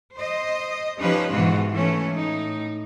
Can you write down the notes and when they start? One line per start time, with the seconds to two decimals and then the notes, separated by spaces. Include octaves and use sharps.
0.15 C5 D#5
0.99 F3 C#4 D#4 G4 B4
1.32 G#2 B2 D#3 E3 F4 F#4
1.73 E3 A3 C#4
2.14 A2 D#4